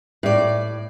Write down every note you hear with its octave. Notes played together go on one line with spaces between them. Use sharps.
A2 D5